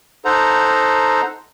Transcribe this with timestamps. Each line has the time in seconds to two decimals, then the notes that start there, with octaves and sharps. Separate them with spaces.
0.25 D#4 A4 C5 F#5 A#5